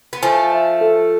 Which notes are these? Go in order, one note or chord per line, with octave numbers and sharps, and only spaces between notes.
B3
F3 A3 G#5
E5
A4